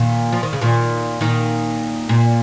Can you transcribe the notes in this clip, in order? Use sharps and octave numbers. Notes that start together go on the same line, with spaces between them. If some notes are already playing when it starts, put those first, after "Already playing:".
Already playing: A#2 D#3
F3
D#3
C#3
A#2 D#3
A#2 D#3
A#2